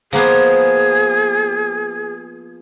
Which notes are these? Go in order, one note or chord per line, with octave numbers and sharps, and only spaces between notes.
F3 A#3 B3 G#4